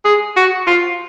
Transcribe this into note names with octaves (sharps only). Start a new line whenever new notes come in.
G#4
F#4
F4